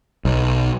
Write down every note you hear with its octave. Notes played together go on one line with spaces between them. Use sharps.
B1